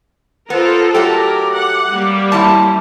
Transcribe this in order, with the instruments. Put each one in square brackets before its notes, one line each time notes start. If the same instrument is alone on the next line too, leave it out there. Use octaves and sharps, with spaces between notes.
[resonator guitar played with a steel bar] B3 [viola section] F4 A4 A#4 [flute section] C5
[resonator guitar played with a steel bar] F#3 A3 G4 [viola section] A#4 [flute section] D6
[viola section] F#5
G3 A#3
[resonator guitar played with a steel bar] F#2 E4 A5